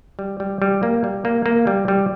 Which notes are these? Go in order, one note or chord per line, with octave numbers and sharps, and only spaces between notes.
G3
G3
G3
A#3
G3
A#3
A#3
G3
G3